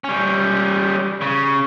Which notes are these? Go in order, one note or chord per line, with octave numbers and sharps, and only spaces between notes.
G3 C#4
C#3